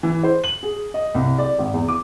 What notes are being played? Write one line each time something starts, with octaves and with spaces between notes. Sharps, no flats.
E3
C5
F#7
G#4
D#5
C2
D5
G#1
E2
D6